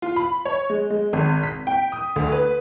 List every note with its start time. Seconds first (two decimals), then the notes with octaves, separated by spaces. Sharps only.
0.02 F4
0.16 B5
0.45 C#5
0.70 G#3
0.90 G#3
1.13 G#1
1.43 B6
1.67 G5
1.92 D#6
2.16 D2
2.32 B4